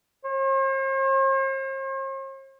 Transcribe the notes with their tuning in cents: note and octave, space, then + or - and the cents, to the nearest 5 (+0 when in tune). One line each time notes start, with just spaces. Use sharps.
C5 +45